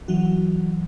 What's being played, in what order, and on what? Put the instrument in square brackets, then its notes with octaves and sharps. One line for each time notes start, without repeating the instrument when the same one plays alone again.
[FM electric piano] E3 F#3 F#4